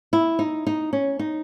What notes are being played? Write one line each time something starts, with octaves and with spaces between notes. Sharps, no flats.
E4
D#4
D#4
C#4
D#4